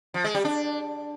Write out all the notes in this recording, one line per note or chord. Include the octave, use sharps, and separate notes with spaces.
F3
G#3
G3
D4